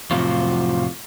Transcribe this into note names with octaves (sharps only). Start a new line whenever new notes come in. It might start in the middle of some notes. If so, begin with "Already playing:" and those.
F2 A2 C3 F3 F#3 F4